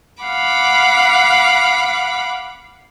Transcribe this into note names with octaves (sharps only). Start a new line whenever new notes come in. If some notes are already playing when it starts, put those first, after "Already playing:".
F5 F#5 B5 D6